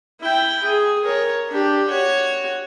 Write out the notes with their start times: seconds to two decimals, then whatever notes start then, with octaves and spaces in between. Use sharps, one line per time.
0.21 E4 G5
0.64 G#4
1.05 A#4 C#5
1.49 D4 G4
1.87 F#4 C#5